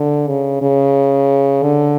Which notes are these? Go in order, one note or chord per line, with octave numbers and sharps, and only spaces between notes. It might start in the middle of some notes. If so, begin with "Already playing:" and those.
Already playing: D3
C#3
C#3
D3